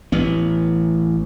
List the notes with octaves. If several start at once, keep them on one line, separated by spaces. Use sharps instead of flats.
A1 B3